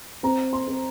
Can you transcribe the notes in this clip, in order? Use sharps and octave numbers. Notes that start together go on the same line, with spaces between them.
C4 A#5
C6
C4